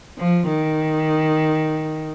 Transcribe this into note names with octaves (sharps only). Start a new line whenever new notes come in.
F3
D#3